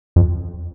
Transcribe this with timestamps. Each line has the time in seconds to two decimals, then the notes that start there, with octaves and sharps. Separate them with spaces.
0.16 F2